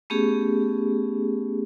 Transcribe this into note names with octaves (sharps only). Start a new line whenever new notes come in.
A3 B3 C#4 G4 G#4